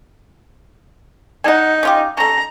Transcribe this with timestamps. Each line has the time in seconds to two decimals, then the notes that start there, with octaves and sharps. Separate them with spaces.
1.44 D#4 F#5 G#5
1.83 C#4 F4 G4
2.17 C#4 A4 A#5